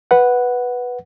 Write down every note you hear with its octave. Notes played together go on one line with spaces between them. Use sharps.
B4 F#5